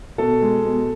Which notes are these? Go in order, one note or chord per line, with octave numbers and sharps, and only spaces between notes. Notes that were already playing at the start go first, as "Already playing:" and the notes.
B2 A4
G#3
B2